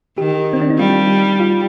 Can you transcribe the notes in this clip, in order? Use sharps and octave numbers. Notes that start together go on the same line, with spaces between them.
D#3 G4
C4
D4
D#4
G3 F4
F4